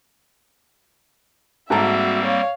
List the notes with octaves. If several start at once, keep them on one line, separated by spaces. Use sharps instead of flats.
G#2 G3 A#3 C4 F#4 A4 E5 A#5
C#5 F5